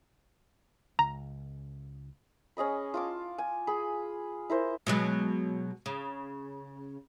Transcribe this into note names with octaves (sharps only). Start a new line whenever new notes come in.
C#2 A#5
C#4 G#4 D#5 B5
F4 A5 D6
G#5
G#4 B5
E4 A#4 C5
B2 F#3 G#3
C#3